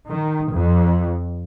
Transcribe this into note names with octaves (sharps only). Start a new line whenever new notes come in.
D#3
F2